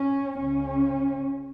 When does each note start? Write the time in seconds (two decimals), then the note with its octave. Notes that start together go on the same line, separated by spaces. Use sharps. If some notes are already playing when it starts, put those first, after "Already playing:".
Already playing: C#4
0.38 C#2 C#3 C#4